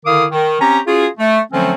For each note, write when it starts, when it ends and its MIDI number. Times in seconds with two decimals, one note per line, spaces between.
0.06 0.25 50
0.06 0.25 51
0.06 0.25 64
0.06 0.25 77
0.06 0.25 86
0.06 0.25 87
0.31 0.57 51
0.61 0.80 60
0.61 0.80 61
0.61 0.80 67
0.61 0.80 82
0.87 1.07 61
0.87 1.07 65
0.87 1.07 66
0.87 1.07 68
1.18 1.40 57
1.52 1.74 50
1.52 1.74 53
1.52 1.74 54
1.52 1.74 57
1.52 1.74 60
1.52 1.74 61